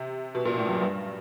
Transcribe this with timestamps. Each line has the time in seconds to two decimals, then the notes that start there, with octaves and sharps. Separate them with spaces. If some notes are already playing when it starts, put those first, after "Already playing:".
Already playing: C3
0.35 B2
0.45 A#2
0.58 A2
0.69 F#2
0.81 G2